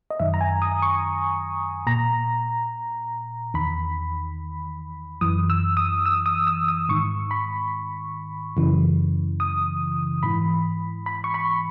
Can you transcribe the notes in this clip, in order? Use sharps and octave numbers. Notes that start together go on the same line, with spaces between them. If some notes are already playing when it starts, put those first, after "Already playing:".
D#5
F#2 D#3 E5
A#5
G#5
D#6
C#6
A#2 A#5
E2 D#3 B5
F#2 E3 D#6
E6
D#6
E6
D#6
E6
D#6
G#2 D#3 C#6
B5
F#2 C#3 E3
D#6
G#2 E3 B5
B5
C#6
B5